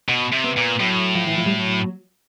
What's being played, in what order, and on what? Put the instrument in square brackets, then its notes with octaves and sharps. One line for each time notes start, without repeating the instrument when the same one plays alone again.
[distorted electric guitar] B2
C3
[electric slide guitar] B3
[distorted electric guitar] A#2
[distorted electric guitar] A2 [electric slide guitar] F#3
[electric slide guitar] F3
E3
F3
G3
F#3